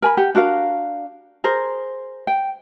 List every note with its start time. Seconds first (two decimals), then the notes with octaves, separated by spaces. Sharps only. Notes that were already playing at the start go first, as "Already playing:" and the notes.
0.02 A#4 G#5 B5
0.17 G4 F#5
0.35 D4 F#4 A#4 F5
1.44 G#4 A#4 C5
2.27 G5